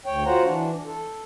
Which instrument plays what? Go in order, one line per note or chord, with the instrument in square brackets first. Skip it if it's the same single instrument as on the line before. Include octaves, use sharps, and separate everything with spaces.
[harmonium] D2 C#5 G5
F4 F#4 C5 F#5 A#5
E3 D4
A4